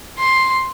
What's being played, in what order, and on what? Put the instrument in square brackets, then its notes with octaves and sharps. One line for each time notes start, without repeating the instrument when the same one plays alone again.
[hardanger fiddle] C6